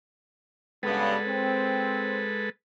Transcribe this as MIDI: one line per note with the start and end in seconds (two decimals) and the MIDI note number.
0.83 1.15 43
0.83 1.15 49
0.83 2.50 56
0.83 1.15 59
0.83 2.50 69
0.83 2.50 71
1.27 2.24 60